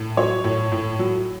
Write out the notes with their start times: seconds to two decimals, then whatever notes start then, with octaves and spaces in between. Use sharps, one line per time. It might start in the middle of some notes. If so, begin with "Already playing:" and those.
Already playing: A2
0.17 F#3 C#5
0.44 A2
0.72 A2
0.99 F#3